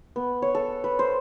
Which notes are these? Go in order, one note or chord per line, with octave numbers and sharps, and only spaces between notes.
B3
C#5
A4
B4
C5